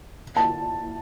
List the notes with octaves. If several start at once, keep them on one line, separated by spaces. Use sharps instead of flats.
A5